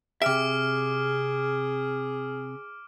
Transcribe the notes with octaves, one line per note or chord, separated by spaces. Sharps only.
C3 G#4 E5 D6 F6 D7